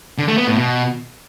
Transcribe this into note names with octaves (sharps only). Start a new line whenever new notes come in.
D3
A3
B3
A2
B2